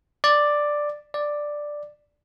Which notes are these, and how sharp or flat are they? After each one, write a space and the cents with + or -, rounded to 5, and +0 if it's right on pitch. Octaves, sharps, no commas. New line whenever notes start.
D5 +5
D5 +5